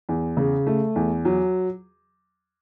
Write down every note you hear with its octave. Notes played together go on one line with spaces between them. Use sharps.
E2
C#3
A3
E2
F#3